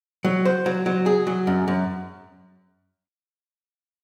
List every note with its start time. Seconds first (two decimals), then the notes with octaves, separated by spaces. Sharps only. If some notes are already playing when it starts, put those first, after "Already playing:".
0.24 F#3
0.45 C5
0.66 F#3
0.86 F#3
1.06 G#4
1.27 F#3
1.47 F#2
1.68 F#2